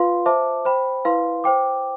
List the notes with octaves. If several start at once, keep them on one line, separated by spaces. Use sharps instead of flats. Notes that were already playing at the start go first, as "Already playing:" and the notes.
Already playing: F4 B4 F5 C6
C5 E5 A5 D6
C5 G5 B5
E4 B4 F5 C6
C5 G5 D6